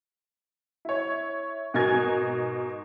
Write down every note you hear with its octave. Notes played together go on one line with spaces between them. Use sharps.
E4 C#5
G#2 B2 D#4 A#4 G#5 G#6